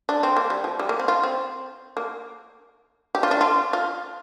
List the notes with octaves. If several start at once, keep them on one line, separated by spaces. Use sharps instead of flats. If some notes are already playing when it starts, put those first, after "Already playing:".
D4
C4
A#3
G3
F3
G3
A#3
C4
F4
C4
A#3
G4
F4
D4
F4
F4